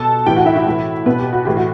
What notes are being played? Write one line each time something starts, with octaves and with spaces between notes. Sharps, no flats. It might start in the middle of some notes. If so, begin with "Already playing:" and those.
Already playing: B2 A4 A5
A2 E3 G4 G5
F#4 F#5
E4 E5
E4 E5
A2 E3
B2 B3 B4
G4
F#4
A2 E3 G4
F#4